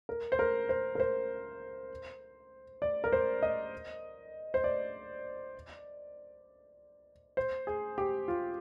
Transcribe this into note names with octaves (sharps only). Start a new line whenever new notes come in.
A#4
C5
A#4
C5
A#4
C5
D5
A#4
C5
D#5
C5
D5
C5
G#4
G4
F4